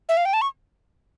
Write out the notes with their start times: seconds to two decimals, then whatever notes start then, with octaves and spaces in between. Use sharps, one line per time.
0.09 E5
0.17 F5
0.25 G5
0.33 A5
0.42 C#6